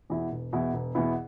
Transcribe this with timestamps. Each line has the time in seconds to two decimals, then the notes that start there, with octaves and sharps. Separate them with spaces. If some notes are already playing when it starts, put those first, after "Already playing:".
0.10 E2 B2 B3 E4
0.32 E1
0.53 E2 B2 B3 E4
0.73 E1
0.95 E2 B2 B3 E4